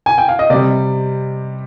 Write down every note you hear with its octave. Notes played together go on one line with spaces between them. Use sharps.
G#5
G5
F5
D#5
C3 G3 D5